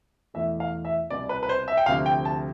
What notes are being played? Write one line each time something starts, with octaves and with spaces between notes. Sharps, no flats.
E2 B2 A3 E5
F5
E5
C2 B2 B3 D5
B4
B4
C5
E5
G5
D2 C3 F3 F5
G5
A5